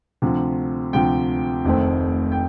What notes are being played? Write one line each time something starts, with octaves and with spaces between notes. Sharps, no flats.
D2 C3 F3
D2 C3 F3 G5
F1 F2 D#3 A3 C4
G5